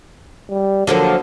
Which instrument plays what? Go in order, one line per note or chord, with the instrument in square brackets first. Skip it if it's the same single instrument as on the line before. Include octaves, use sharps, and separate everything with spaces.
[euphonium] G3
[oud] D3 F3 A#3 [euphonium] F#3